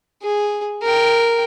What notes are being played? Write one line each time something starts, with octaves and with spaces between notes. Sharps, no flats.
G#4
A#4 G5